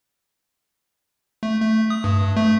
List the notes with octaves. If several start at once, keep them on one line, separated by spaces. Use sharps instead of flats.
A3
A3
D#6
G2
A3